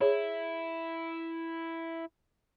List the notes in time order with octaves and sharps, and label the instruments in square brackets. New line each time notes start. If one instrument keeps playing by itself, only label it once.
[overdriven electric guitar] E4 [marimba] G#4 C#5